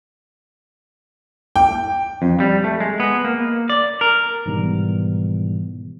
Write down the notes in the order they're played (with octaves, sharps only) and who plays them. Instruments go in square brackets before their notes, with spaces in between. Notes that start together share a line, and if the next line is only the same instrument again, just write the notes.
[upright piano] G5
[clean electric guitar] F2
G3
A3
G#3
B3
A#3
D5
A#4
[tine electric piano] G#2 B2 D#3 E3 G3 B3